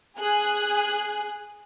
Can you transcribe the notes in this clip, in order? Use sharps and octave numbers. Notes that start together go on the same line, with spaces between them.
G#4 F#6